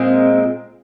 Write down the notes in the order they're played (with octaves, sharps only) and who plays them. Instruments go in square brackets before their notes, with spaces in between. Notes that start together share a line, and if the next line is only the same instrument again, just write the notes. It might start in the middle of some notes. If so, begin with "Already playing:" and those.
Already playing: [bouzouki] A#2 G#3 [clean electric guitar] C4